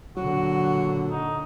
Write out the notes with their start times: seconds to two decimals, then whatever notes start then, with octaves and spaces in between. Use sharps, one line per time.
0.17 A#2 D3 F#3 F#4
1.10 D#4